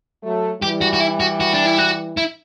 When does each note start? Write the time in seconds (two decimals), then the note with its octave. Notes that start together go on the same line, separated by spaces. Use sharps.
0.23 F#3 A3
0.61 E3 G3 G4
0.81 F#4
0.93 F#4
1.00 E4
1.20 F#4
1.40 F#4
1.54 D4
1.66 E4
1.78 F#4
2.17 E4